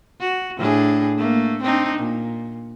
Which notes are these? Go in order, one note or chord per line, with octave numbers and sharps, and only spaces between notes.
F#4
A2 D4 G#4
A3 A#3
C4 D4 D#4
A#2